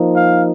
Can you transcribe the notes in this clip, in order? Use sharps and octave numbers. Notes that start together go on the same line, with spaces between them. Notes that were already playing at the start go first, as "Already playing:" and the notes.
Already playing: F3 A#3 D#4
F5